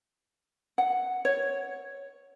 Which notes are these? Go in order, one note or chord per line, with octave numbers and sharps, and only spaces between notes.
F#5
C#5